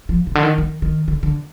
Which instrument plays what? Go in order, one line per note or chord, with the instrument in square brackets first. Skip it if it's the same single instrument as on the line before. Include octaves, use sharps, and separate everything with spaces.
[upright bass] F3
C3
D3
D#3
D#3
D#3
D3
D3